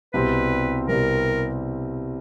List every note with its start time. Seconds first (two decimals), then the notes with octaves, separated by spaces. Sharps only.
0.14 C2 B2 G3 C4 B4
0.87 C2 B2 G3 C4 A#4